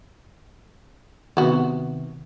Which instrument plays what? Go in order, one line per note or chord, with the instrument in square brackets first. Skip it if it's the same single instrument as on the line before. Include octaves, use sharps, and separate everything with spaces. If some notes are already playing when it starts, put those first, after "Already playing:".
[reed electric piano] C3 D#3 [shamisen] B3 F#4